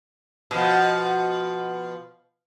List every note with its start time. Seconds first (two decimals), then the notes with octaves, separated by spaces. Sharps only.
0.51 B2 F3